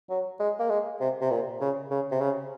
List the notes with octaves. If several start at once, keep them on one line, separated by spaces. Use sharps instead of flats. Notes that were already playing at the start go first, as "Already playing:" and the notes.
F#3
G#3
A#3
G#3
C3
C3
A#2
C#3
C#3
C3
C#3